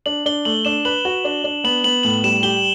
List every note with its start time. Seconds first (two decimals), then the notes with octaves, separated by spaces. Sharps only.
0.06 D4 F#7
0.26 D4 G7
0.45 A3 F#7
0.65 D4 E7
0.85 B4 F#7
1.05 F#4
1.25 D4
1.44 D4
1.64 B3 F#7
1.84 B3 F#7
2.03 A2 F#7
2.24 G3 E7
2.43 G4 G7